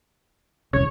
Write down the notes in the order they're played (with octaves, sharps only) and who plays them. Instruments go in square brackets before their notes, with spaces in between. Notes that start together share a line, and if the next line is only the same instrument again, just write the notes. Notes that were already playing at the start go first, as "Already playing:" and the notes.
[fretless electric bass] E1 C2 C#3 [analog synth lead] C#5